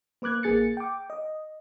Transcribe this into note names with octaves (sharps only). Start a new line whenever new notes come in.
A#3 B4 D6 F#6 G#6
A1 A#3 G#4 A6 C#7
G5 D6
D#5